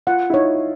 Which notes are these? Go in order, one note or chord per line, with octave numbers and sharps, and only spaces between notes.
F4 F#5
E4
D#4 C#5